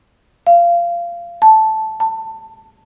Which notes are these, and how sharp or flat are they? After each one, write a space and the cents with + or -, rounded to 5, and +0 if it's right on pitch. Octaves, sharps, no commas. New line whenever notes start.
F5 -20
A5 -5
A5 +20